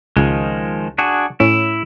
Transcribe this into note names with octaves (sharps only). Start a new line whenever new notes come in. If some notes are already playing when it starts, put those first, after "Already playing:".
C#2 D#3 F3 G#3
D4 F#4 G#4
A2 C#4 E4